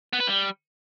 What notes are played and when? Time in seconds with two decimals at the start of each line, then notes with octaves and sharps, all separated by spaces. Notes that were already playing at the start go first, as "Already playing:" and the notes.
0.13 B3
0.20 B4
0.27 G3